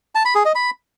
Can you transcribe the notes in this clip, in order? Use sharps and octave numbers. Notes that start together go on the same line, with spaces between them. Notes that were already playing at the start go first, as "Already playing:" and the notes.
A5
B5
G#4
D#5
B5